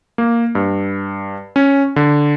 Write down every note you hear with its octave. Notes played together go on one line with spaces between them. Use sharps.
A#3
G2
C#4
D3